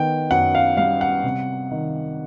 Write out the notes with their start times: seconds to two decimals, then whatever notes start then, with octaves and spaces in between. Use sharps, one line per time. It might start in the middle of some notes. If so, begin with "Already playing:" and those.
Already playing: D#3 B3 G5
0.31 F#2 F#5
0.55 F5
0.77 G3 F5
1.01 F#5
1.23 C3
1.71 D#3